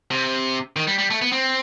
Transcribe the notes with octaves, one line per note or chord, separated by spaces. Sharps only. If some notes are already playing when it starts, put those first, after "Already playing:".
C3
D#3
G3
G3
A3
B3
C4